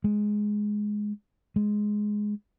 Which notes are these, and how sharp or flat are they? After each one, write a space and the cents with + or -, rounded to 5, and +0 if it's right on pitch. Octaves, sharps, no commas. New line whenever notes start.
G#3 +5
G#3 +5